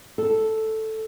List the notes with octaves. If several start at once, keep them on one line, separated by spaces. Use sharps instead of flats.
A4